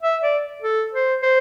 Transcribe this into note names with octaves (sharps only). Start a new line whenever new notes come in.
E5
D5
A4
C5
C5